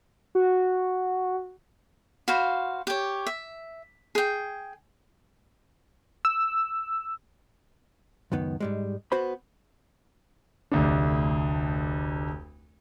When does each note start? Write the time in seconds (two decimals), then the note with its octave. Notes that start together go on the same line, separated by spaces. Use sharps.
0.35 F#4
2.28 F#4 C5 F5 B5
2.87 G4 C#5
3.26 E5
4.15 G#4 G5
6.25 E6
8.32 C#2 F#2 D#3 B3
8.60 G#2 G3 G#3
9.12 B3 F#4 C5 B5
10.72 F1 D2 D4